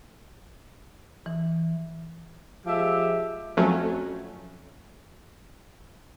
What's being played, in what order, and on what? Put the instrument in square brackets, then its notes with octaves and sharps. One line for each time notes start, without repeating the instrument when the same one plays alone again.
[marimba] E3
[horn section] F3 G#3 G4 E5
[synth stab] F2 F#3 A3 C#4